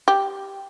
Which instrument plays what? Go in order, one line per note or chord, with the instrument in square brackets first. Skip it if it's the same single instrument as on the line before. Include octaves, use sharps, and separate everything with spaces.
[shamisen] G4